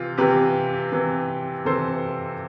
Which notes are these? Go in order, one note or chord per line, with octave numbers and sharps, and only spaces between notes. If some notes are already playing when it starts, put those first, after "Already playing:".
Already playing: C3 E3 F4
C3 E3 G4 B4
C3 E3
C3 E3 A4 C5